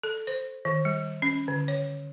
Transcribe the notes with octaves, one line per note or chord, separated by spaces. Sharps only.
A4
C5
D#3
G3
C#4
D3
C#5